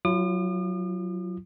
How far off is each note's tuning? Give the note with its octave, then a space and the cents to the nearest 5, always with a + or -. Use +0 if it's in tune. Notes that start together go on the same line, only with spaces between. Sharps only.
F#3 +0 F4 -40 D#6 -45